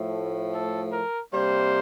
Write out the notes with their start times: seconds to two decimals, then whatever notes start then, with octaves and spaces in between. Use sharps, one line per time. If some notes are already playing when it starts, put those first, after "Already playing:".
Already playing: A2 F3 A3
0.53 A4
0.92 A#4
1.32 C3 G3 A#3 C5